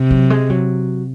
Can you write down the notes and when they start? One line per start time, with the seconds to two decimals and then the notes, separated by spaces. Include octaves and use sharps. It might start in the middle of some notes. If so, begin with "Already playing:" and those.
Already playing: C3
0.11 F#3
0.30 G#3
0.50 F#3